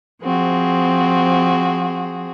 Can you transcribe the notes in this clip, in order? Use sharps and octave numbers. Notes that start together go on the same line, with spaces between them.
F3 C4 F#4 G#4